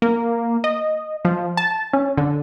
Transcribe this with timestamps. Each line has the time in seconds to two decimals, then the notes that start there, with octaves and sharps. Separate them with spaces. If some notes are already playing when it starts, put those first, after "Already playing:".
0.02 A#3
0.64 D#5
1.25 F3
1.57 A5
1.93 C#4
2.18 D3